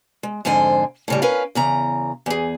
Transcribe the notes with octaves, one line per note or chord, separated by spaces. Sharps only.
G#3
F2 G#2 D3 C5 G#5
A2 C#3 G3
C#4 A#4 B4 F5
E2 C#3 A#5
E2 G#4